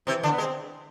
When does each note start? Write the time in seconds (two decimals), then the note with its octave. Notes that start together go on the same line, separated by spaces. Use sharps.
0.07 C3 E3 C4
0.19 D3 E3 D4
0.31 B3
0.38 G#3
0.42 C4